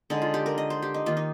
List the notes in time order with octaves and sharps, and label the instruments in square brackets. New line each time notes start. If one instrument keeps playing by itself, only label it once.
[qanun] D3 G#3 D#4
F4
G4
A#4
D#5
C5
G4
D#4
D#3 A#3 F4
D#4